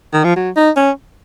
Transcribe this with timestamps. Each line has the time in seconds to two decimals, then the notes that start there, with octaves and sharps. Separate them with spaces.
0.13 D#3
0.24 F3
0.36 F#3
0.56 D#4
0.76 C#4